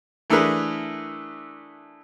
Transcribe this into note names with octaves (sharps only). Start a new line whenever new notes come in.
E3 A3 D4 G#4 A#4 B4